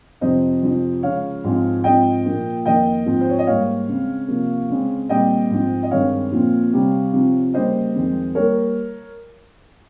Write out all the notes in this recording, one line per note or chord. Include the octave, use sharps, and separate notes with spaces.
F2 C3 F3 C4 C5 D#5
F2 C3 F3
C#3 F3 G#3 C#5 F5
G#2 F3 G#3 C4
G#2 F3 C4 D#5 G5
A#2 F3 A#3
F2 D#3 A#3 D#5 G5
G#2 F3 C4
C5
C#5
D#5
G#2 G3 A#3 C#5 F5
C#3 G#3 C4
C3 F3 A#3
C#3 G#3 C4
A#2 G3 C4 D#5 G5
G#2 F3 C4
D#5
G2 D#3 G#3 C4 C#5 F5
A#2 F3 C4
C3 G3 C4
C3 F3 C4
C#3 G3 A#3 C5 D#5
F2 D#3 G#3 C4
G3 A#3 A#4 C#5